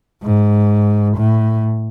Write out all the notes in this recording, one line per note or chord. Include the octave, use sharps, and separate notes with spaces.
G#2
A2